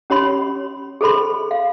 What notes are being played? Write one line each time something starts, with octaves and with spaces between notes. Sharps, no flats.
C#4 G4 C#5 B5 C6
G#4 A4 C5 B5 C6
F5